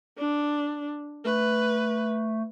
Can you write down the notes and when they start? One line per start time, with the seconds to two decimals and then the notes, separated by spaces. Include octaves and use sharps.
0.18 D4
1.24 A3 B4